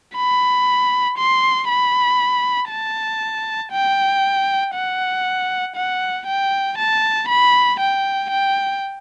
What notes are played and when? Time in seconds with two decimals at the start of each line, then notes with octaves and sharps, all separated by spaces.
0.16 B5
1.18 C6
1.68 B5
2.70 A5
3.72 G5
4.74 F#5
5.76 F#5
6.27 G5
6.78 A5
7.28 B5
7.80 G5
8.30 G5